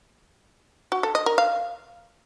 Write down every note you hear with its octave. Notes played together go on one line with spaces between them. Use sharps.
F#4
A4
D#5
A#4
F5